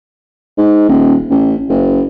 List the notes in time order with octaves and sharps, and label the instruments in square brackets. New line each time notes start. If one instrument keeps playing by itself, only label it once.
[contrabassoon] G#2
D#1
A1
F#1